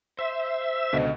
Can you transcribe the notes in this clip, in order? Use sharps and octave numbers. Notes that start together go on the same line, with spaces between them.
C5 E5 C6
C#2 B2 D3 D#5